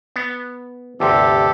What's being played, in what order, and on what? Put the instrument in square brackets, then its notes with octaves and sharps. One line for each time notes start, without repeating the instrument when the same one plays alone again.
[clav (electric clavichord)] B3
[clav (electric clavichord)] G1 D2 C3 [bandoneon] G4 A4